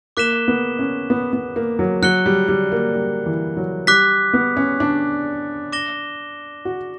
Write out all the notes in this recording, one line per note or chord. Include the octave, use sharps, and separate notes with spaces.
A#3 D6 F#6 B6 E7 G7
B3
C#4
B3
B3
A#3
F#3
F#3 F#6 C#7 G7
G3
G3
A#3
G3
E3
F#3
G3 D6 F#6 B6
B3
C#4
D4
D6 A#6 E7 G7
F#4